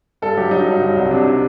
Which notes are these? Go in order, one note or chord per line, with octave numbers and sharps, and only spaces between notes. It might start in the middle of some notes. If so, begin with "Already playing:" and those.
G2 A4
F#3 G4
F#3 D#4
G2
F#3
C2
C3 D4